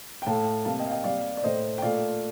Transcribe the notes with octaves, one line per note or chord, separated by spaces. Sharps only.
G5
A2 A3 F5 A5
C3 G3 A#3 F5 A5
D#5 G5
F5
D#5 G5
C3 G3 A#3 D5 F5
D5
A2 A3 C5 D#5
G5
A#2 A3 D5 F5